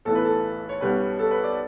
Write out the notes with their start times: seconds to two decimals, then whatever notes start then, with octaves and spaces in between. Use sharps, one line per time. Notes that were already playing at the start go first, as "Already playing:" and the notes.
0.05 B1 A2 E3 A4
0.15 B4
0.25 A4
0.69 C#5
0.81 B1 B2 G3 C#4 B4
1.19 A4
1.31 B4
1.44 D5